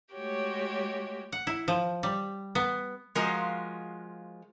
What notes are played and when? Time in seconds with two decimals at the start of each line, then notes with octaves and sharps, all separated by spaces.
0.14 G#3 A3 F#4 G4 C#5
1.32 F#5
1.47 E4
1.68 F3
2.03 G3
2.55 B3
3.15 F3 G#3 F4 F#4 A#4